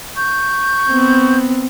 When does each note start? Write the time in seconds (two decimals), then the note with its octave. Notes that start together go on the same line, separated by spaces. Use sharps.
0.15 C#6 G6
0.89 B3 C4